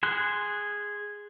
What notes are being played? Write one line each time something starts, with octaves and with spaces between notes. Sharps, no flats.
G#4 C6 F#6